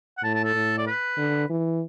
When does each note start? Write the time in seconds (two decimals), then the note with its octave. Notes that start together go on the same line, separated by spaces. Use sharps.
0.18 F#5
0.23 A2 A5
0.34 A5
0.44 A4
0.55 A2
0.78 D5
0.87 B4
1.18 D3
1.50 E3